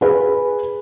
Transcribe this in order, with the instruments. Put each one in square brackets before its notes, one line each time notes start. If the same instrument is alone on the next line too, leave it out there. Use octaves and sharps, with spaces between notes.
[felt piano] G#4 B4